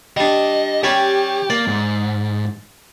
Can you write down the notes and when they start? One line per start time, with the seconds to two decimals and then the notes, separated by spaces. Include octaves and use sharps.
0.17 G3 D4 D#5
0.84 G3 C#4 G4 D5
1.50 A#3 D5
1.67 G#2